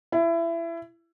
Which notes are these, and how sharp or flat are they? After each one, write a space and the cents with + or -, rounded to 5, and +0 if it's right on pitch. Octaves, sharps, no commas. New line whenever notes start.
E4 +25